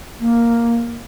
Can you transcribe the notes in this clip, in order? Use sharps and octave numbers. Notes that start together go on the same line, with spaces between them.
A#3